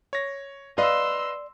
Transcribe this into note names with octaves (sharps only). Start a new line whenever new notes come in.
C#5 A#6
B4 D5 D#5 F5 C6 E6